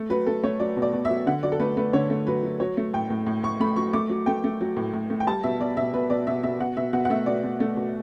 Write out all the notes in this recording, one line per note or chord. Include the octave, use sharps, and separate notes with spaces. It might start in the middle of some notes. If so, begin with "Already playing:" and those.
Already playing: A3
F#3 B4
A3 A4
A3 C#5
F#3 D5
B2
D5
B2
F#3 E5
D3 F#5
F#3 D5
A4
A3 B4
A3 B4
D3 C#5
A3
F#3 B4
F#3
F#3 C#5
A3
A2 G5
A2
A2
A2 C#6
A3 B5
F#3 C#6
A3 D6
F#3
A3 G5
A3
F#3
A2
A2
A3
G5
G3 A5
B2 E5
B2 D5
B2 E5
B2 B4
B2 D5
B2 E5
B2 E5
B2 F#5
B2 E5
B2 F#5
F#5
A3 E5
B2 D5
B2
A3
B2